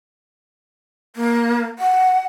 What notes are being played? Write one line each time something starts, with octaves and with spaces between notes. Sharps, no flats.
A#3
F#5